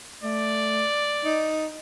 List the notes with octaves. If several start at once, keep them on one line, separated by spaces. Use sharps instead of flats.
A3 D5
D#4